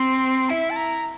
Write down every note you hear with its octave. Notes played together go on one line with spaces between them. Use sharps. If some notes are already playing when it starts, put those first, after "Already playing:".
Already playing: C4 C6
E4 E5
A5
A#5